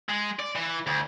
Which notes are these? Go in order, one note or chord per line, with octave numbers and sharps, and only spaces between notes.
G#3
D5
E3
D2